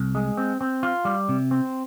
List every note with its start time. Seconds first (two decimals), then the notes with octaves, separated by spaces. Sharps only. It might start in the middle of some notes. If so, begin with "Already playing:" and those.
Already playing: C2
0.15 G#3
0.37 C4
0.61 C4
0.83 F4
1.05 G3
1.29 C3
1.51 C4